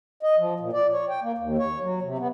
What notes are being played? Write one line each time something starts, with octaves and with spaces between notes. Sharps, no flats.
D#5
F3
A#2
D5
C#5
G5
A#3
D#2
C#5
F#3
C3
B3